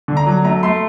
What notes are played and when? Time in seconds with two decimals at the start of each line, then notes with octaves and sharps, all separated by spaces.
0.08 D3
0.17 A#5
0.26 F#3
0.45 A3 A#5
0.63 A3 C6